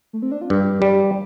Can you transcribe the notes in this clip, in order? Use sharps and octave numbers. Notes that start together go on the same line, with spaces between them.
A3
C4
D4
F4
G2 G4
G3